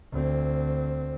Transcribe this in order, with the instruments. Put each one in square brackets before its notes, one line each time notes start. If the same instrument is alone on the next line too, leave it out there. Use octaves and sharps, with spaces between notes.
[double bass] D2 C4